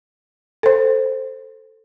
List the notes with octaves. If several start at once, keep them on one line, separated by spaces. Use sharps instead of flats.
A4 C5